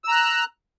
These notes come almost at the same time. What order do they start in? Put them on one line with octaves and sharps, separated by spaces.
E6 A#5 F#6